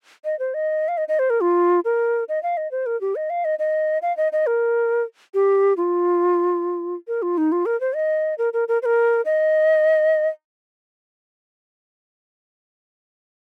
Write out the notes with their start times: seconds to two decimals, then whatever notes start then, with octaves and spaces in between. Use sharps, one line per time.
0.25 D#5
0.39 C5
0.54 D#5
0.88 F5
0.98 D#5
1.08 D#5
1.19 C5
1.30 A#4
1.41 F4
1.85 A#4
2.29 D#5
2.43 F5
2.57 D#5
2.71 C5
2.86 A#4
3.01 G4
3.16 D#5
3.30 F5
3.45 D#5
3.59 D#5
4.02 F5
4.17 D#5
4.32 D#5
4.47 A#4
5.34 G4
5.77 F4
7.08 A#4
7.22 F4
7.38 D#4
7.52 F4
7.66 A#4
7.80 C5
7.95 D#5
8.38 A#4
8.53 A#4
8.68 A#4
8.82 C5
8.86 A#4
9.25 D#5